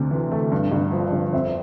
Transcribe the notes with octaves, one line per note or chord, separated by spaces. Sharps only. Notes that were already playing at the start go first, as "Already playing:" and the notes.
Already playing: D2 C3
E3
A3
G2
G1
F3
G1
F2 C5 E5